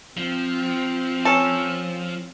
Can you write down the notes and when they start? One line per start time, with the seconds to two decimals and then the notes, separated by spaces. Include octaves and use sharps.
0.17 F3 C4
1.25 C#4 A4